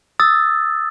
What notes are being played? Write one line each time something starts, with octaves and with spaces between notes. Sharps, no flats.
D#6 E6 A6